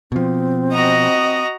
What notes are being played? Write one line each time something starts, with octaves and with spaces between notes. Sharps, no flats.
B2 F3 C4
F#4 D#5 A#5